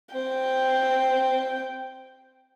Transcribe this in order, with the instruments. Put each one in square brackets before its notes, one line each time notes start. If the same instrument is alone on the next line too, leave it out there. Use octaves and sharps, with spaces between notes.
[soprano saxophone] C4 [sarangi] G5